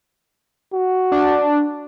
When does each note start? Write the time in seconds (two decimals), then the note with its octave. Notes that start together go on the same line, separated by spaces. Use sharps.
0.73 F#4
1.12 D4